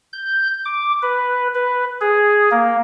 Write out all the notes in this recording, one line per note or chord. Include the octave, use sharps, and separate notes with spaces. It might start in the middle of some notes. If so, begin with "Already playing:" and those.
G6
D6
B4
B4
G#4
A#3